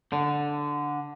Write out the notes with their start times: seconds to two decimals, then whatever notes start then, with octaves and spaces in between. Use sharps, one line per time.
0.12 D3